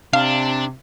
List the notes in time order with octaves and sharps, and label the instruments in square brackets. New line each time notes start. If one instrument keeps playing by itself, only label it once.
[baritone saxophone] C3 [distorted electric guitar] D4 [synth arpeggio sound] F5